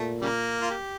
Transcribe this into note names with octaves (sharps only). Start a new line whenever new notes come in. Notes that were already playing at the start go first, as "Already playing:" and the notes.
Already playing: A#2 A3
C#3 G3 A#3
F4
G4